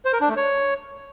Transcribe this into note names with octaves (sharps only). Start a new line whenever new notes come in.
C5
A#4
D4
A3
C#5